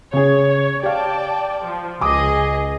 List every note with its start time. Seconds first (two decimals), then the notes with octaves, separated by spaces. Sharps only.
0.13 C#3 G#4 C#5
0.83 G4 D5 F5 G5 A5
1.65 F3
2.01 C#2 G#4 D#5 G#5 D6 D#6